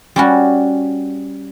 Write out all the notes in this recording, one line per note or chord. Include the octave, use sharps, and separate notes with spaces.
G3 C#4 F#4